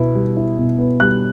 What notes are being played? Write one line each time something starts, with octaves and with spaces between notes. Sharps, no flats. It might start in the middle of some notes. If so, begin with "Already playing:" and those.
Already playing: B2 B3 E4
G3
E4
B2
B3
G3 F#6